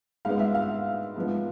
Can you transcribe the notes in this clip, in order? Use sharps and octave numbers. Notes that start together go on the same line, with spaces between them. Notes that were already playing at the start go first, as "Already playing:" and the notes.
G#2 G#3 B3 F5
E5
F5
G#2 F3 B3